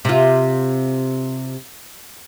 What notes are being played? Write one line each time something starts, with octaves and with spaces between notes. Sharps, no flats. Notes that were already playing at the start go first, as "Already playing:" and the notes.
C3 F4